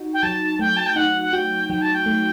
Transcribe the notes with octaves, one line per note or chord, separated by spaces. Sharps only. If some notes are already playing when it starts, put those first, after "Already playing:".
Already playing: D#4 F#4
G5
F#3 A5
A3 G5
A5
G5
D#4 F#5
F#5
F#4 G5
F#3 G5
A5
G5
A3